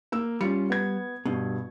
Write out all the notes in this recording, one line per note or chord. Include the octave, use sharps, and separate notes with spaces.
A#3 E6
G3 C#4 F4 C#7
B3 G#6
G2 B2